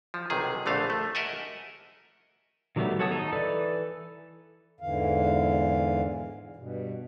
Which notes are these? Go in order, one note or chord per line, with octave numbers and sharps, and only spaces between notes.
F3
B1 C3 D#3 G#4
A#1 D3 A3 F5
A3
A#4 D#5 E5 F#5 G#5
D#3 F#3 G3 A3 B3
F#4 A4 C#5 A5 D#6
D#4
E3 A4 B4 D5
E2 G#2 D3 E3 F5
G2 B2